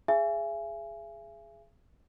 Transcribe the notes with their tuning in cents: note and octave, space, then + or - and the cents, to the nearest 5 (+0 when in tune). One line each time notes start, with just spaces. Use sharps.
G#4 +0 E5 +40 G#5 +0